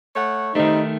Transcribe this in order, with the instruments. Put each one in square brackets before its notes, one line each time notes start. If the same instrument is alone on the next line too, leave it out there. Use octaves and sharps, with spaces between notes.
[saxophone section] A3 C#5 F#5
[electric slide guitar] D#3 A3 [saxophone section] G3 C4 C5 [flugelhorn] D#4